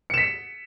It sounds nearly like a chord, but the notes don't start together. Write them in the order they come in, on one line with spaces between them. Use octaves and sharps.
C#7 E7 B6